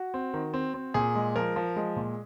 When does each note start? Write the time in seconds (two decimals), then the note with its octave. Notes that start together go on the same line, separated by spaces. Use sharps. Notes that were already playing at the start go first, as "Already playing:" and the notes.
Already playing: F#4
0.14 C4
0.34 D#3
0.54 C4
0.74 C4
0.94 A#2 G#4
1.15 G#3
1.36 F3 A#4
1.56 F3
1.76 G#3
1.96 A#2